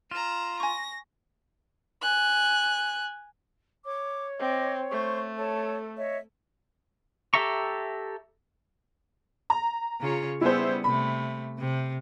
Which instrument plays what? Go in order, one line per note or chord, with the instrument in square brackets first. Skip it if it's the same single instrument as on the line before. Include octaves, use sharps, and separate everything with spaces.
[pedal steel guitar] F4 [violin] A#5 E7
[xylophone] G#5 C#6 [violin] A#6
[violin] G#5 F#6
[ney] C#5 [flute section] D6
[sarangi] C4 [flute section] D#5 D6
[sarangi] A3 [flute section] C5 C6 C#6
[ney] A4 [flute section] C#5 A5
[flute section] C#5 D#5 E5
[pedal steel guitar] G4 A4 E5 A#5 C#6
[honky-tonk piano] A#5
[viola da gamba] C#3 F4 C#5
[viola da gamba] G3 B3 C#4 [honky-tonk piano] E4 G#4 C5
[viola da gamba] C3 A3 [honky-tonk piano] B5
[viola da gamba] C3